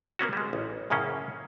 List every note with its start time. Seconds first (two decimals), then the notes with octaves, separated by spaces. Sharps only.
0.19 A#3 B3 C#4 F#4
0.33 G3 G#3
0.53 A1
0.90 F#2 A2 C#3 A#3 C#4